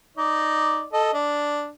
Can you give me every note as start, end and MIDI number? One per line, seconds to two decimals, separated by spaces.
0.17 0.86 63
0.17 0.86 74
0.93 1.12 69
0.93 1.12 75
1.14 1.69 62